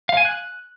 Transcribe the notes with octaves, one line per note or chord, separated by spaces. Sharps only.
F5
G#5
F#6